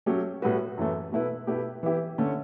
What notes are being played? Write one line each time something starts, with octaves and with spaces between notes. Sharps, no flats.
F#3 A3 C#4 G4 C#5
A2 G3 B3 F#4 B4
F#2 E3 A3
B2 A3 E4 B4
B2 A3 E4 G4 B4
E3 B3 E4 G4
D3 A3 C#4